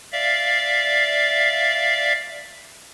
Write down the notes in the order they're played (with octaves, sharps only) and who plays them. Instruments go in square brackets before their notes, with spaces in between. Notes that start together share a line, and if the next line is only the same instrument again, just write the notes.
[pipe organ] D5 E5 F5